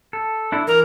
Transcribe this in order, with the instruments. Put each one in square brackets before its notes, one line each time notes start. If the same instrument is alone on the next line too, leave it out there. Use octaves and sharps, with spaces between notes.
[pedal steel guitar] A4
D4 E4 A4
[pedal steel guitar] E3 [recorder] A#4